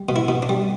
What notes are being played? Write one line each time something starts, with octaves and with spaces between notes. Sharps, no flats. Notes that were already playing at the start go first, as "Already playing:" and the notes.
Already playing: G3
B2
E4
B2
D4
G3